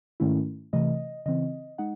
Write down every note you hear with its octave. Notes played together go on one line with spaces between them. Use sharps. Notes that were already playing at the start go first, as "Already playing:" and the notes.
G#2 D#3 A3 C#4 E4
C3 E3 A3 D#5
C#3 E3 C4 D#5
G#3 D#4 F#5